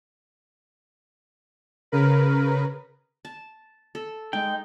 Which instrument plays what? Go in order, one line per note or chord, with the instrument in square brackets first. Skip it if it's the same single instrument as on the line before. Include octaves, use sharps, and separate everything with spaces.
[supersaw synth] C#3 A#4 B4
[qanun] A5
A4
[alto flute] G#3 [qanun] D#4 [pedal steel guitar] G5